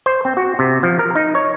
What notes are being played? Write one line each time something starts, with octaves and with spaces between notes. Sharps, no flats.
C5
C4
F#4
C3
F3
A#4
D#4
C#5